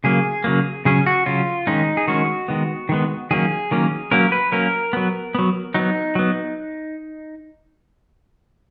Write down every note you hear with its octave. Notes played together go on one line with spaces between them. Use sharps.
C#3 F#3 A#3 G#4
C#3 F#3 A#3
C#3 F#3 C#4 G#4
F#4
C#3 F#3 C#4 F4
D#3 G#3 C#4 D#4
G#4
D#3 G#3 C#4 F#4
D#3 G#3 B3
D#3 G#3 B3
D#3 F#3 A#3 C#4 G#4
D#3 F#3 A#3 C#4
F#3 A#3 C#4 A#4
B4
F#3 A#3 C#4 A#4
F#3 B3
F#3 B3
F#3 B3 D#4
F#3 B3